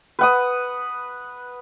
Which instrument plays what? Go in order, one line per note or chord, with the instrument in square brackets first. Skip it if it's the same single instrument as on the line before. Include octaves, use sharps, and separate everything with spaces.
[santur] B4 F#5 D#6